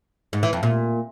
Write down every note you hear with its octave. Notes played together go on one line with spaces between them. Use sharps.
G#2
E3
F2
A#2